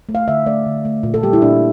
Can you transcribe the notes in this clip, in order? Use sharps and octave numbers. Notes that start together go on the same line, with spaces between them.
A3
F5
D3 E5
A3 D5
D3
A3
A#2
A4
G3 A#3 G4
E4
A#2 D4